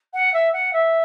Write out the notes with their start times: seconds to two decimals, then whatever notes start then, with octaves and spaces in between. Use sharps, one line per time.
0.13 F#5
0.33 E5
0.53 F#5
0.73 E5